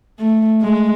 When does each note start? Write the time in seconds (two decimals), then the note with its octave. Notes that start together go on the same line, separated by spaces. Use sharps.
0.19 A3
0.61 G#3